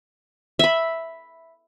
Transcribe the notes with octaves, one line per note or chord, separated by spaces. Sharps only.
E5 B5